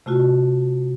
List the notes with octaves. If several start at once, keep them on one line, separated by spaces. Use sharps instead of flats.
C3 A3 F4 F#4